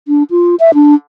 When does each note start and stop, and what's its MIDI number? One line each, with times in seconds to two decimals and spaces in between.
0.08 0.23 62
0.30 0.55 65
0.60 0.71 76
0.74 0.95 62